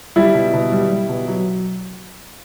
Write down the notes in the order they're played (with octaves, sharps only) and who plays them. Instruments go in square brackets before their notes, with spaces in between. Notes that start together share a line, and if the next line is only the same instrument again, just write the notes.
[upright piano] G3 E4
B2
B2
G3
G3
B2
F#3